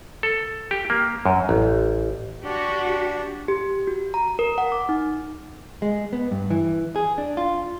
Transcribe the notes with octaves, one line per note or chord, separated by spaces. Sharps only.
A4
G4
A#3
F#2
A1
D4 F#4 G4
G4
F#4
A#5
A#4
F#5
D6
D#4
G#3
B3
G2
E3
G#4
D4
F4